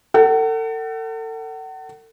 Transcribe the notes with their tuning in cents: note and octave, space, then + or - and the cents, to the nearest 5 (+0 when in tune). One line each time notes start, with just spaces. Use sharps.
A4 +35 F#5 +35